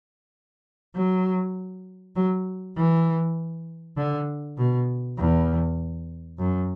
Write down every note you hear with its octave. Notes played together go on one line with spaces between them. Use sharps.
F#3
F#3
E3
D3
B2
E2
F#2